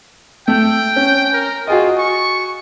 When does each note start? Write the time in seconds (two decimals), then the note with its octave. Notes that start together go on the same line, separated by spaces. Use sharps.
0.48 A3 G5
0.96 C#4
1.33 A#4
1.67 F4 F#4 G#4 D#5
1.98 C#6